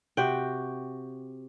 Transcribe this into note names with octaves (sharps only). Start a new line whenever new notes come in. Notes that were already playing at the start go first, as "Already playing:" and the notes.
C3 F#4 G5